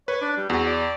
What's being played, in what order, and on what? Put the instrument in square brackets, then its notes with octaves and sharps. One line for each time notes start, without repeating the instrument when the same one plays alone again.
[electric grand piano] B4 [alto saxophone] C#5
[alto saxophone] D4
G3
[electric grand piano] E2 [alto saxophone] F#4
[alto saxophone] D5